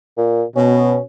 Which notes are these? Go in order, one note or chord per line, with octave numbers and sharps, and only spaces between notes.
A#2
B2 C#4